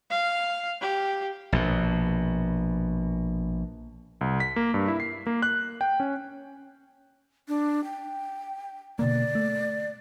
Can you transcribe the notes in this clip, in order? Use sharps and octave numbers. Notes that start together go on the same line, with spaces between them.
F5
G4
A#1 B2
C2
B6
A#3
G2
E4
C7
A#3
F#6
G5
C#4
D4
G5
B2 D3 A#3 D5
A3